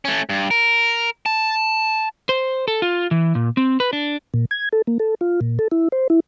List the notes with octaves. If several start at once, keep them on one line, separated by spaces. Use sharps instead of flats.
A3 C#4
G2
A#4
A5
C5
A4
F4
E3
A#2
C4
B4
D4
A#2
G#6
A4
A#3
A4
F4
A#2
A4
E4
C5
E4